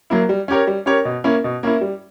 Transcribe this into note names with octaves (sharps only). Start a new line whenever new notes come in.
F#3 A#3 E4
G3
C#4 G4 A#4 C#5
G3
C#4 G4 A#4 C#5
B2
A#3 C#4 E4
B2
A#3 C#4 E4
G3